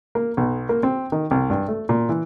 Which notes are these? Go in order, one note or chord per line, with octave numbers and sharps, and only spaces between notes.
A#3
B1
A#3
C4
D#3
C2
G2
A3
A#2
E3